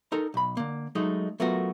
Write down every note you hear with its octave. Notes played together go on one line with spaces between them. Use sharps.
D#4 A4 A#4 A#5
B1 B5
D3 A#3
F#3 G#3 A3 D#4
F#3 A3 B3 F4 F#4 A#4